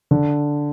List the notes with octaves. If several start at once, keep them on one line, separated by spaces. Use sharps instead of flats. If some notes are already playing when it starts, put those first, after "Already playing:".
D3